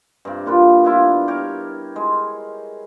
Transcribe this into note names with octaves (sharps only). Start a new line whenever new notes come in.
G2 C3
A#2 F4 B4
B3 D4 E4 F4
G4 A#4 C#5
G#3